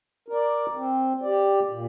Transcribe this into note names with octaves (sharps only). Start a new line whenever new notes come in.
A#4 D5
C4
G4 D5
A#2